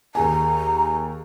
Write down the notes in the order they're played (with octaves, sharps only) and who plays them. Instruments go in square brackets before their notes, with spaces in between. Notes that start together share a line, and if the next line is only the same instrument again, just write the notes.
[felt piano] D#2 G#4 G#5 [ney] A#5